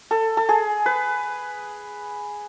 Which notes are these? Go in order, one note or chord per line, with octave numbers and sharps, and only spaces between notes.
A4
A4
G#4
B4